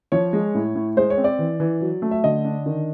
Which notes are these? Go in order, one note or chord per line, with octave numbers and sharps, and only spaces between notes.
F3 C#5
G#3
A2
A2
G#3 C5
C#5
C4
D5
E3
E3
F#3
A3
E5
D3 D#5
D4
D#3